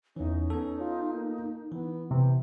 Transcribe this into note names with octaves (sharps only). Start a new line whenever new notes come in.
E2 E3 C#4 D#4
B3 A4
F4
A#3
E3 B3
C3 B3